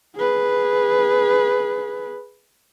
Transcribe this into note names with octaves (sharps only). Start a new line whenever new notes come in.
G#4 B4